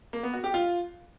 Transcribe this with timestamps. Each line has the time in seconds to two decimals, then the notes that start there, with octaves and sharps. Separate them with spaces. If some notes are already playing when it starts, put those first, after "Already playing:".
0.13 A#3
0.23 B3
0.34 F#4
0.44 G4
0.54 F4